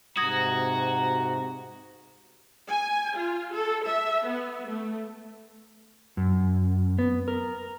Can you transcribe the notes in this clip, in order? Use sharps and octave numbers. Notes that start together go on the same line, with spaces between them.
G#2 C3 F#4 A#5 D#6 G#6 A#6
G#5
F4
A4
E5
B3
A3
F#2
B3
A#4